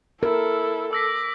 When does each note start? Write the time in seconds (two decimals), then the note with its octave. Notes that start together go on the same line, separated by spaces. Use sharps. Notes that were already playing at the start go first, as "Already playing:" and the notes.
0.23 E4 A4 A#4
0.93 D6 E6 A#6 B6